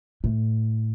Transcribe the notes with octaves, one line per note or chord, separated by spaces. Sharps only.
A2